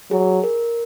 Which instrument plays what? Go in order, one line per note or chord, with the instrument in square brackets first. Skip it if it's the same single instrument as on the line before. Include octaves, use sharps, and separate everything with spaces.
[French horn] F#3 [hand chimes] G#4
[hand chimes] A#4